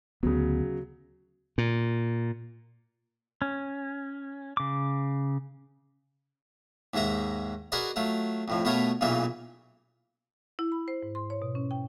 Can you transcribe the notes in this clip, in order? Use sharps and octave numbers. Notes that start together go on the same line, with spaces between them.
D2 C#3 F#3 B3
A#2
C#4
C#3 D6
D#2 G#2 G#3 E5 A#5
F#4 G#4 A#4 B4 D5 D#5
F#3 A3 F4
F2 A2 F3
B2 A3 B3 F4 A#4 C#5
B1 A#2 C#3 E3 F4 E5
E4
B5
C5
G#2
C6
C#5
B2
C#4
G5